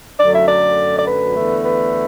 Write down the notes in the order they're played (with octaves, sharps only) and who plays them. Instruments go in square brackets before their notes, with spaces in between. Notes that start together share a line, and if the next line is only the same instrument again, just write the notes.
[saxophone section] F#2 D3 F#3 A3 D5
E5
D5
D5
B4
E2 D3 A3
B4